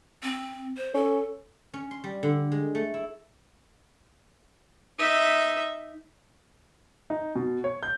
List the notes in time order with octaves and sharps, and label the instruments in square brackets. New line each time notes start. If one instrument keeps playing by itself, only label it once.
[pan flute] C4
C5
[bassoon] C#4 [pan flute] A4
[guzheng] C#4
C6
G3
D3
G#3
A3
E4
[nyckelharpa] D#4 E5
[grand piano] D#4
B2
C#5
G6